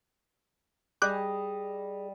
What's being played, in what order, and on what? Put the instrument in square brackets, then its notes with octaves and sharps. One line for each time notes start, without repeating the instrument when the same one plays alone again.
[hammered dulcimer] G3 D#5 [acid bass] G#4 [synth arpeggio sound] D6 F#6 G6